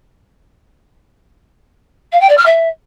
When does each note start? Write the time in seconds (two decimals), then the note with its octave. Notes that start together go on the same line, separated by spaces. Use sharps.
2.12 F5
2.20 G5
2.29 D5
2.37 F6
2.45 E5